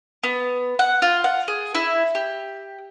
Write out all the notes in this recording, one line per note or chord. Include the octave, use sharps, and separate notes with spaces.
B3
F#5
F4
F#5
G#4
E4
G4